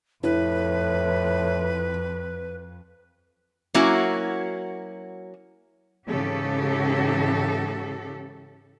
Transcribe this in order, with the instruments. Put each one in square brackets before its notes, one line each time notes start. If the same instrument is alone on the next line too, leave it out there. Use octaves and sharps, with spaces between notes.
[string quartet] F2 [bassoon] A2 [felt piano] E4 [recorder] B4
[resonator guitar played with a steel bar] F#3 A#3 C#4 E4 F#4
[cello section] G#2 C#3 E3 G4 A4